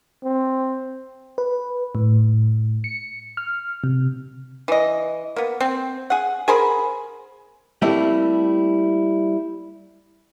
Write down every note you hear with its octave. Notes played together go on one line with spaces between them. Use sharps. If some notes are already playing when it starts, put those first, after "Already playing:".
C4
B4
A2
C#7
F6
C3
E3 D#5
A#3 B3
C4
G#4 F#5
G#4 A#4 C5 B5
G3 A3 A#3 C4 E4 G4